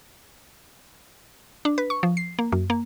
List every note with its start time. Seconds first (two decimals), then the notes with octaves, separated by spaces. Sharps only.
1.65 D4
1.78 B4
1.90 C#6
2.03 F3
2.17 C7
2.39 A#3
2.52 F#2
2.70 A#3